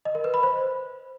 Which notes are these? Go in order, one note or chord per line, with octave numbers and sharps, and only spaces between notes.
D#5
A#4
B4
B5
C5